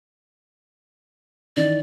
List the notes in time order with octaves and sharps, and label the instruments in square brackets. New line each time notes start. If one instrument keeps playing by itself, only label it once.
[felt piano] D#3 E3 [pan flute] D5